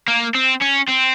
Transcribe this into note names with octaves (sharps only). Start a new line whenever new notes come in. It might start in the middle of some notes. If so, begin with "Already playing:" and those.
A#3
C4
C#4
C4